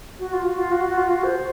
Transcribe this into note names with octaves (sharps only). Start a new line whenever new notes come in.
F#4
F4
F#4
F4
F#4
F#4
F4
F#4
C5